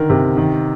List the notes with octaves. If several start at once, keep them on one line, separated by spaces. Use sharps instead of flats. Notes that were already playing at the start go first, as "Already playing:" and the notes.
Already playing: D3 D#3 A#4
C3
D#3